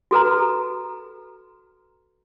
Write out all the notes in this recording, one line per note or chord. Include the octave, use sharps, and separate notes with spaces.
F#4 A4 B4 A#5